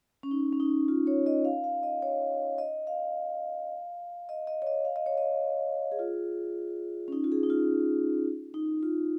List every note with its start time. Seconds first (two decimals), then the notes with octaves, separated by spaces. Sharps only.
0.23 C#4
0.31 D#4
0.53 C#4
0.60 D#4
0.88 F4
1.07 C#5
1.26 D#5
1.45 F5
1.64 F5
1.83 D#5
2.02 C#5
2.58 D#5
2.87 F5
4.29 D#5
4.47 D#5
4.62 C#5
4.67 D#5
4.85 F5
4.96 D#5
5.06 C#5
5.18 D#5
5.92 G#4
5.99 F4
7.08 C#4
7.12 D#4
7.24 F4
7.32 G#4
7.43 D#4
7.50 F4
8.54 D#4
8.83 F4